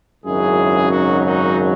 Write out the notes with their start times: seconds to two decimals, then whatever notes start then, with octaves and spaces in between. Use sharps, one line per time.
0.24 G#1 F#2 C#3 F#3 E4 G#4
0.90 D#4 F#4
1.23 D#4 F#4